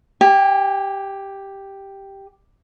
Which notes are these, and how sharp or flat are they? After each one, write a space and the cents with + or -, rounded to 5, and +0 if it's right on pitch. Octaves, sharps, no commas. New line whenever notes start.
G4 +0 G#5 -30